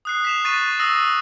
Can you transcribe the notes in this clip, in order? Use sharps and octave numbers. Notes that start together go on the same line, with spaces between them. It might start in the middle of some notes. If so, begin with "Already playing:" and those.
D#6 F#6 C7
B6 E7 F7
C#6 A6 C7 D#7 F7
D#6 E6 A#6 C7 D#7 F7